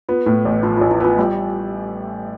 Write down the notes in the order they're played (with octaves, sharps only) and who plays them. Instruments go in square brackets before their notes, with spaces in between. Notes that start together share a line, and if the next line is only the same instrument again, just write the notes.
[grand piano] B3 [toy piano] F4
[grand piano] A2
A1
[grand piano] F3 [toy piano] F4
[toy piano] F4
[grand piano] A1
[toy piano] E4
[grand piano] B3 [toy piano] F4
[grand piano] G3 [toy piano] F4